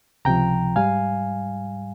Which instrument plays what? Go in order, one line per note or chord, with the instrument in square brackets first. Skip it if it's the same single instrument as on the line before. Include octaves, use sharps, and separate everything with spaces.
[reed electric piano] C#2 C3 F3 G5 A#5
G#2 G3 F5 G#5